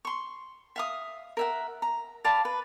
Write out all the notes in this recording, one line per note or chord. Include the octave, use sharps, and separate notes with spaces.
C6 C#6
E5 F5 D#6
A#4 E5 F#5
A#5
D5 F5 A5 B5
B4